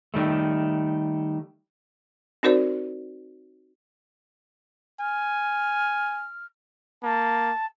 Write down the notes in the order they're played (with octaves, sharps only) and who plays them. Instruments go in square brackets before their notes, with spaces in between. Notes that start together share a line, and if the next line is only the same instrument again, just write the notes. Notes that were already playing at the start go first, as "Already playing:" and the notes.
[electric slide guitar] D#3 G3 A3
[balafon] C4 D#4 F#4 A#4 C5 D5
[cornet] G#5 [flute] F6
[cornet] A#3 [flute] A5